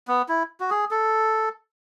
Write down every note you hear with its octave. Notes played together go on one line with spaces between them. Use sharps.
B3
E4
F#4
G#4
A4